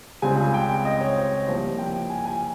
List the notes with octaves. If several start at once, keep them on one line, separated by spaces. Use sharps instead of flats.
C#2 C#3 G3 C4 G#5
G#5
G5
D#5
C#5
C5
C2 C3 F3 A#3 C5
G5
G#5
G#5